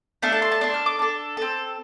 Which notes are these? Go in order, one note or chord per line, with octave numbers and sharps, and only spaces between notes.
A3 D4 A4 F5
A5
C6
A5
D4 A4 C6
F6
D6
D4 A4
C4 A4